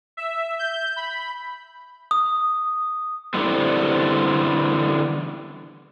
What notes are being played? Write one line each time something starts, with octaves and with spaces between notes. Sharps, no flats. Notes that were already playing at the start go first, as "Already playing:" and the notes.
E5
G6
B5
D#6
D3 E3 G3 B3 C4